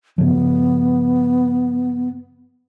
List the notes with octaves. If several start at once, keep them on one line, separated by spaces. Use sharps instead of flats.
G2 C#3 F3 B3